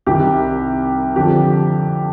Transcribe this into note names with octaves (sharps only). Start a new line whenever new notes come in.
C2 C3 D#3 G4
F2 D3 F3 G4